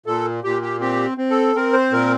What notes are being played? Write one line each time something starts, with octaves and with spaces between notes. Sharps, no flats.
A#2 A4
A#2 G4
G4
C4 G4
C4
A4
C4 A#4
C5
A#2 A#4